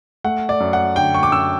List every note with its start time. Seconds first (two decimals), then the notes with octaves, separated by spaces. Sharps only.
0.24 A3 F#5
0.49 D5
0.60 F#2
0.73 F#5
0.96 D3 G5
1.14 C#6
1.23 D6
1.32 F#2 E6